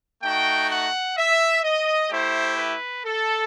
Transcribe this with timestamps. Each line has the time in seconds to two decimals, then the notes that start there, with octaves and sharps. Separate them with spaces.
0.23 A3 D#4 F#4 G5
0.70 F#5
1.17 E5
1.63 D#5
2.10 A3 E4 G4 C5
2.57 B4
3.04 A4